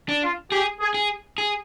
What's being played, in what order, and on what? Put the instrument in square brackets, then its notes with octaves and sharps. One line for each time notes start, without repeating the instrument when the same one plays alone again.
[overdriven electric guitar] D4
[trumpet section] F4
[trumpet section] G4 [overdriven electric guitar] G#4
[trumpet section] G#4
[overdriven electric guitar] G#4
G#4